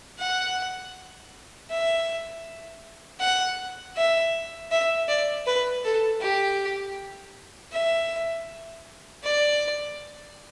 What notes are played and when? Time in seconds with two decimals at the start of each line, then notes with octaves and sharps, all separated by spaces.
0.19 F#5
1.70 E5
3.20 F#5
3.96 E5
4.71 E5
5.08 D5
5.46 B4
5.84 A4
6.21 G4
7.73 E5
9.24 D5